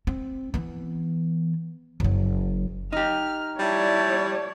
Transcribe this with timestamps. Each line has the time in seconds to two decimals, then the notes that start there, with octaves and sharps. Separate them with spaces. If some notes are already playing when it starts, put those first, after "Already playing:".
0.07 C4
0.54 E3 B3
2.00 F#1 F#3
2.93 D#4 G4 F6
3.59 G3 E4 C#5 D5 A5